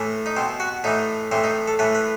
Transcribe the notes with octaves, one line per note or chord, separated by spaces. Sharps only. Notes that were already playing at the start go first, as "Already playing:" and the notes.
Already playing: A2 E3
D#4
B2 C4
F#4
A2 E3 D#4
A2 E3 C4
D#4
A4
A2 E3 B4
B4